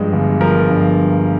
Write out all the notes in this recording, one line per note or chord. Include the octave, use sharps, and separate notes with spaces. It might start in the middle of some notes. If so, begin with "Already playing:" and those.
Already playing: G2 F3 G#3
G1
F3 A#4
G2